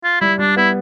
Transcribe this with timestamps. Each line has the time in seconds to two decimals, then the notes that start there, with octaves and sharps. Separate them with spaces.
0.04 F4
0.21 G3 E4
0.39 G3 D4
0.56 B3 E4